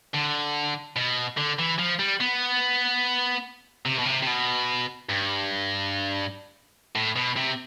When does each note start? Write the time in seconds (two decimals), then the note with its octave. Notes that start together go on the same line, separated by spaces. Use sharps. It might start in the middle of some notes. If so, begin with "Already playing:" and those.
0.14 D3
0.96 B2
1.37 D3
1.59 E3
1.79 F3
1.99 G3
2.20 B3
3.86 C3
3.99 B2
4.06 C3
4.22 C3
4.27 B2
5.09 G2
6.96 A2
7.16 B2
7.37 C3